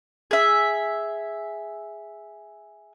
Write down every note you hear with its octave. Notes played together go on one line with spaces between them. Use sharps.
G#4 E5